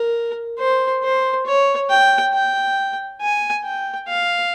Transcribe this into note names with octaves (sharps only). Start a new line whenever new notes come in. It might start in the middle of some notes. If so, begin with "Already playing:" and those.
Already playing: A#4
C5
C5
C#5
G5
G5
G#5
G5
F5